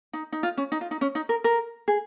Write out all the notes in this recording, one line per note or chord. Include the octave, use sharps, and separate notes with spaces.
D#4
D#4
F4
C#4
D#4
F4
D#4
C#4
D#4
A#4
A#4
G#4